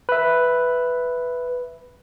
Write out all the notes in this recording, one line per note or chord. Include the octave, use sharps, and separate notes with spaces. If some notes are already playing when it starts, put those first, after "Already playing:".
B4 E5